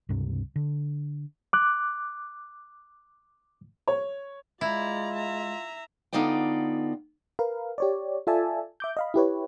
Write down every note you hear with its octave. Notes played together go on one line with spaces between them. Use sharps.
C#2 G2 C3
D3
D6 F#6
C#5
G#3 E4 F4 D5 A#5
E5 A#5
D3 B3 D#4 F4 D5 G5
A#4 B4 F5
G4 C#5 D5
F4 A4 D5 E5 G#5 A5
E5 D6 G6
D#5 F5 B5
E4 G4 B4 C#5